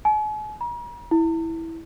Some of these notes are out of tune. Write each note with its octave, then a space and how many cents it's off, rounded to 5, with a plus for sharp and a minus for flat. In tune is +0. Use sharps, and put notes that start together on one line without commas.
G#5 +45
A#5 +40
E4 -10